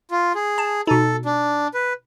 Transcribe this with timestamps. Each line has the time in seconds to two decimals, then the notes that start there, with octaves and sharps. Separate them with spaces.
0.11 F4
0.35 G#4
0.58 A5
0.87 B2 D#4 A4
1.25 D4
1.74 B4